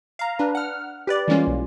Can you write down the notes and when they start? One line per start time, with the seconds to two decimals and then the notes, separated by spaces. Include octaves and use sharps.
0.19 F5 A#5
0.39 D4 B4
0.55 F#5 F6
1.07 G4 B4 D5
1.28 E3 G3 G#3 A#3 C#4 F4
1.47 B1